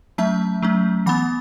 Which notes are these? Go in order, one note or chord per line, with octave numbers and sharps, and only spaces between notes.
F#3 A3 C#4 E5 A5
F#3 A3 C#4
E3 B3 F#5 B5